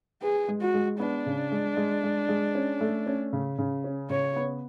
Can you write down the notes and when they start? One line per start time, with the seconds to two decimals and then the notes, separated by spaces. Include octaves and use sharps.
0.22 G#4 B4
0.48 G#3
0.61 F#4
0.74 G#3
1.00 B3 D4
1.26 C#3
1.52 G#3
1.77 G#3
2.03 G#3
2.29 G#3
2.55 C#4
2.81 A3
3.06 C#4
3.33 C#3
3.58 C#3
3.84 C#4
4.10 C#3 C#5
4.36 B3